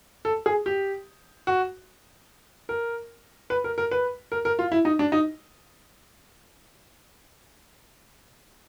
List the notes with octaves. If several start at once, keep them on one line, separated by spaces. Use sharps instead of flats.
A4
G#4
G4
F#4
A#4
B4
A#4
A#4
B4
A#4
A#4
F4
E4
D#4
D4
D#4